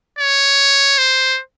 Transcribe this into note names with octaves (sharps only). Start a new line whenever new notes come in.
C#5
C5